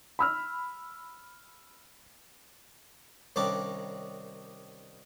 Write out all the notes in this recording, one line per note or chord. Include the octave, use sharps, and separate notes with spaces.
B5 E6 F6
C2 D#3 G3 C#4 D4 D6